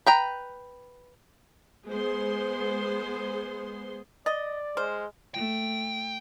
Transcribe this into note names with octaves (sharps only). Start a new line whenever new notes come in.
B4 G5 A#5
G#3 B3 G#4 C5 C6
D5 D#5 A6
G#3 C5 F6
A3 G5